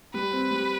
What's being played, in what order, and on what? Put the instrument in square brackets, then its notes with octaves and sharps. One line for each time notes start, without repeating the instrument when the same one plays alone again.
[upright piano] G3 [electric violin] B4
[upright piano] C4
G3